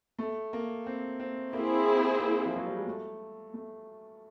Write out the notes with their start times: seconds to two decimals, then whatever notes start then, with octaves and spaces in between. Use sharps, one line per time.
0.19 A3
0.53 A#3
0.86 C4
1.20 C4
1.53 A#3 C4 E4 G#4
2.20 A#3
2.46 F3
2.56 F#3
2.67 G3
2.77 G#3
2.87 A3
3.54 A3